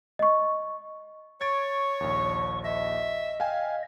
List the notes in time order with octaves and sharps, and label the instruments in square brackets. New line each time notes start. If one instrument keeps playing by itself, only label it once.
[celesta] D#5 C#6
[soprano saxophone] C#5 [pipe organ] C#6 [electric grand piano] G#6 A6 D7
[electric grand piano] A#1 D#2
[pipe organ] D#5 [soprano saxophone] E5
[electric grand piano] F5 G5 G#5